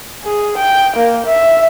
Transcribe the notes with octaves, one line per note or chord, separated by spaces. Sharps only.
G#4
G5
A#3
E5